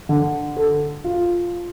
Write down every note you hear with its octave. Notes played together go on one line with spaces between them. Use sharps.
D3
A4
F4